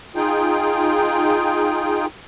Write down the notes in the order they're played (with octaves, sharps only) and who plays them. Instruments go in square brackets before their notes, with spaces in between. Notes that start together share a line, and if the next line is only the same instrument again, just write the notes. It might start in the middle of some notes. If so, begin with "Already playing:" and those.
[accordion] D#4 F4 G#4 G5